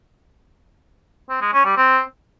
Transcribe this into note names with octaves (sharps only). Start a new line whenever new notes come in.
C4
G#3
C#4
G3
C4